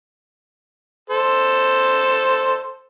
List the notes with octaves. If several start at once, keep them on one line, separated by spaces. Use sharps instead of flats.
A4 C5